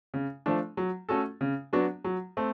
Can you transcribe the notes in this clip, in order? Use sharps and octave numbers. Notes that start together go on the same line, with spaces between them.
C#3
F3 A3 D4
F#3
A3 C#4 F#4 A4
C#3
F#3 B3 D4 F#4
F#3
A3 C4